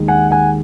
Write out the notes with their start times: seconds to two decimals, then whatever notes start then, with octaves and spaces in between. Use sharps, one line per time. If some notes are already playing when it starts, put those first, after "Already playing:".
Already playing: D#2 D#3 G#3
0.08 F#5 G#5
0.31 F#5 G#5